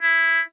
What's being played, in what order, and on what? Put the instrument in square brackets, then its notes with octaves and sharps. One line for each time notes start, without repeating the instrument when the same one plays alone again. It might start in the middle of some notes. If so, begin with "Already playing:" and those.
[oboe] E4